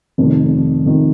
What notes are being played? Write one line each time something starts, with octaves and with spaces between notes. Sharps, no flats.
F1 F2 D#3
F1 F2 D#3